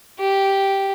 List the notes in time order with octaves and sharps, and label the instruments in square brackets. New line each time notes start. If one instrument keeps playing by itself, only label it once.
[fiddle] G4